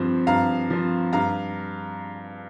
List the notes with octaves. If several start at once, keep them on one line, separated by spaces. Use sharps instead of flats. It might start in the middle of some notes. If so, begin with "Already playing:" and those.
Already playing: G2 F3 C4
G2 F5 A#5
F3 C4
G2 F5 A#5